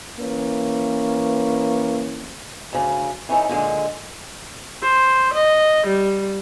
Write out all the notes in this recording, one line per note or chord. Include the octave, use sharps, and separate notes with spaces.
E3 A#3 C#4 B4
D2 C#3
E3 C#4 D#4 A4
A#2 D3 G#3
C5
D#5
G3